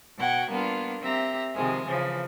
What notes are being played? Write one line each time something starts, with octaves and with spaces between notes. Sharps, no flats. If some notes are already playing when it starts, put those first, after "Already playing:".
B2 F#4 F#5 G5 G#6
G3 A#3 B3 D4 F4
C4 G4 E5 A#5
C3 D#3 F3 G#3 G#4
C#3 E3 F3